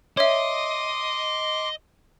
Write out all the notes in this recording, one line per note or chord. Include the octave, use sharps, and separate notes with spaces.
C#5 D#5 E5 C6 D6